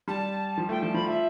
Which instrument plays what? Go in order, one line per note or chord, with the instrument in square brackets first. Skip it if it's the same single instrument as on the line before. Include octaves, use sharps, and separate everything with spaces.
[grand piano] G3 [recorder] A5
[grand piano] F3
[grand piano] A3 [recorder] G5
[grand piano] F3 [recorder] A5
[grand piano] F3 [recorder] B5
[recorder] E5